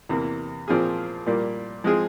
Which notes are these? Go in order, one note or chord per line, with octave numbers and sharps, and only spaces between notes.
E2 C3 E3 A#3
A#2 F3 C4 F4 G#4
A#2 G3 A#3
F3 G#3 C4 F4 G#4